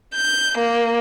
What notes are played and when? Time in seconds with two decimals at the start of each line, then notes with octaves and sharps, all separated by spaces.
0.15 G6
0.58 A#3